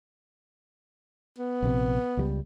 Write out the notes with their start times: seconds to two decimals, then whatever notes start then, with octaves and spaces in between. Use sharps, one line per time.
1.39 B3
1.62 A#1 C3
2.17 C#2 F#3 G3